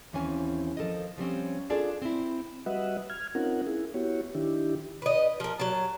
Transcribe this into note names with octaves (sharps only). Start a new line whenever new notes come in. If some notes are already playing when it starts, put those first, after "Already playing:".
D#2 E3 C4 C#4 G#5
F3 A4 A#4 D#5
F3 G3 C4 C#4
D4 F4 G#4 A4 D5
C4 E4
G3 F#4 B4 D#5 E5 F#5
F6 G#6
C4 C#4 D#4 F4 A#4 F#5
E4 G#4
B3 E4 F#4 G4 C#5
D#3 D4 E4 G4
B4 D#5
F3 A#4
F#3 A5